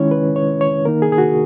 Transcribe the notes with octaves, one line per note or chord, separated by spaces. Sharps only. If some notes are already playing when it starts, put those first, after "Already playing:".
Already playing: D#3 G#3 C#4 E4 C#5
B4
C#5
C#5
D#3 A#3 D#4 A#4
G#4
G#4
F#4